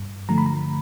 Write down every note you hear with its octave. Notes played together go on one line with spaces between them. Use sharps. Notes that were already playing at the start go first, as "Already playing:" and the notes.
Already playing: G2
D3 F3 A3 A#5
B5
A#5